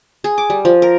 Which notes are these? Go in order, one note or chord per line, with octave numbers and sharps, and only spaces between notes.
G#4
D6
G3
F3
A#4